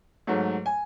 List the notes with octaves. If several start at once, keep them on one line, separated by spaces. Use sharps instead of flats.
G#2 F#3 A3
G#5